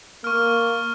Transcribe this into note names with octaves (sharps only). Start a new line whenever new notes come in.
A#3 C#6 F6